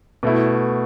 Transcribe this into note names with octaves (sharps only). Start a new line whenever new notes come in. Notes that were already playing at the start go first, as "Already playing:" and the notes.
B2 A3 E4